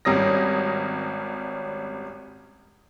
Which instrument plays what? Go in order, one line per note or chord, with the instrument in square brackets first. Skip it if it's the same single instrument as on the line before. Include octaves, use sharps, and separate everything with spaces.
[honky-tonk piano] G#1 G3 C#4 D#6 A#6